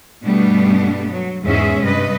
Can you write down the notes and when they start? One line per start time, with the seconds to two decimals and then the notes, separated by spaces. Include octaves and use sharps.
0.24 G2 B2 G3 A3 B3 D4
1.09 F#3
1.43 E2 G#2 G#3 C#4 G#4 E5
1.82 G2 C3 B4 D#5